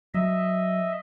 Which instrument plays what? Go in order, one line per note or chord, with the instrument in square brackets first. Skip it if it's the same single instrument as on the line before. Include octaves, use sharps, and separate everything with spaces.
[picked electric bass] F#3 [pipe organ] D#5 E5